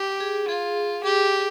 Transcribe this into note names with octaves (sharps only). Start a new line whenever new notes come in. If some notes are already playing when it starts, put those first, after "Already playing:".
Already playing: G4
G#4
F4 G#4
G4 G#4